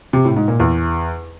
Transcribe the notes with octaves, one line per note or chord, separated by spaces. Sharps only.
C3
A2
G#2
A#2
E2